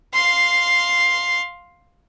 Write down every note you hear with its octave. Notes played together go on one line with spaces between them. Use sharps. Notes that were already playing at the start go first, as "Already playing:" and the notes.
F5 C6